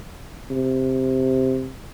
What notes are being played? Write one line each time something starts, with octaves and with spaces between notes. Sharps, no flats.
C3